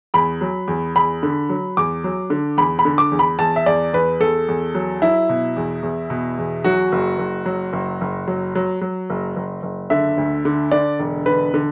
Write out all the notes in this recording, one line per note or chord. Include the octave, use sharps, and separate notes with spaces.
E2 B5
F#3
E2
E2 B5
D3
F#3
E2 D6
F#3
D3
E2 B5
B5
D3
D6
E2
B5
E2 A5
E5
E2 D5
E2 B4
E2 A4
E2
F#3
F#3 E4
B2
E2
E2
B2
E2
F#3 F#4
F#1
F#1
F#3
F#1
F#1
F#3
F#3
F#3
F#1
F#1
F#1
D3 E5
D2
D3
D3 D5
E1
D3 B4
D3